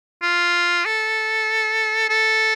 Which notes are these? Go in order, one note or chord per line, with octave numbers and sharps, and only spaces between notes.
F4
A4
A4